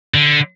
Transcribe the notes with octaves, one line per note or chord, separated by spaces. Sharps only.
D3